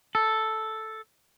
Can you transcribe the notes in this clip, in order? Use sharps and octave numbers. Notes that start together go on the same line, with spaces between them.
A4